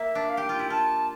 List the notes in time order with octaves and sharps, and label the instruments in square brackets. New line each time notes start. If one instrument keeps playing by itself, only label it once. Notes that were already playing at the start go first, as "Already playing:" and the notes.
Already playing: [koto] A#3 [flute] E5
[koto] D4
[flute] F5
[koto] G4 [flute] G5
[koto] F4
E4
[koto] F4 [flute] A5